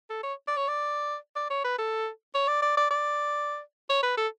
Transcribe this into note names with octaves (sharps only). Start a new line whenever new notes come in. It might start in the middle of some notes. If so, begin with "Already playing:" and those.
A4
C#5
D5
C#5
D5
D5
C#5
B4
A4
C#5
D5
D5
D5
D5
C#5
B4
A4